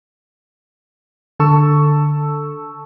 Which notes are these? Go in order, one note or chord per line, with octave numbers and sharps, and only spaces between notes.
D3 A4 A5 C#6 E6